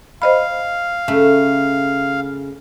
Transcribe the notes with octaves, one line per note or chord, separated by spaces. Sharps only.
C5 D#5 F5 B5
C#3 A3